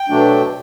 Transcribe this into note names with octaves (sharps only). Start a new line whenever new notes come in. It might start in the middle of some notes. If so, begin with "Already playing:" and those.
Already playing: G5
B2 F#3 A3 D4